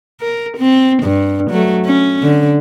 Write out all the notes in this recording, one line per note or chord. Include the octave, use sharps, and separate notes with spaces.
A#4
C4
G2
F#3 A3
C#4
D3